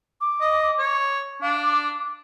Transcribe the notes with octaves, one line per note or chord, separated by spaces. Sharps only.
D6
D#5
C#5
D4 F5
D6